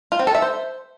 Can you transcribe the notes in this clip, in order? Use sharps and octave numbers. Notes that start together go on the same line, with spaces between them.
F4
C4
A4
E5
C5